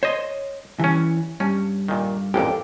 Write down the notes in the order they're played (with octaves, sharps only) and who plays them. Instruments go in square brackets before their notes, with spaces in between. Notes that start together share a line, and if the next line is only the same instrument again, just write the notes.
[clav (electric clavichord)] C5 D#5 [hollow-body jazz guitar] C#5 C6
[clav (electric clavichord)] G2 C#4 [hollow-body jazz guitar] E3
[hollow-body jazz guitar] G2 [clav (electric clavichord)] C#4
[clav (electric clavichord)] A#2 D#3
[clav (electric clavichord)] A1 F2 A#2 [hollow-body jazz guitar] G4